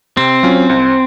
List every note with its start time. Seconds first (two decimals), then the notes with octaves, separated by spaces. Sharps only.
0.16 C3 C4
0.43 F#3 C#4 F4
0.69 C2